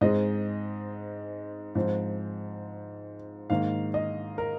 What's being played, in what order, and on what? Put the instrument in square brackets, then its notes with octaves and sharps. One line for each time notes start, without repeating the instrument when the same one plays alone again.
[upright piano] G#2 G#3 C4 D#5
G#2 F3 C4
G#2 D#3 A#3 F5
D#5
A#4